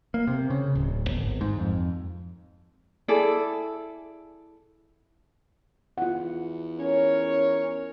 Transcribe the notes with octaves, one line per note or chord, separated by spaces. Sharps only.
A#3
C3
C#3
D1
G1
G#1
G#2
F2
E4 G#4 A4 D5
E2 F4 F#5
C#4 A#4 C#5